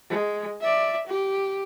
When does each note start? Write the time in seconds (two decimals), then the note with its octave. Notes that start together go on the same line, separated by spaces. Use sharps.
0.10 G#3
0.61 D5 E5
1.07 G4